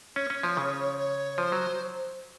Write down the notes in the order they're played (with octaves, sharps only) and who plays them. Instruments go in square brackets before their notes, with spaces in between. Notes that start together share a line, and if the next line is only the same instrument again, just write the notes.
[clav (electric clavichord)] C#4 [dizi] C#5
[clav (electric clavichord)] C#4
F3
C#3
[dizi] C#5
[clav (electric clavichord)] F3 [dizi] C5
[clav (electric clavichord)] F#3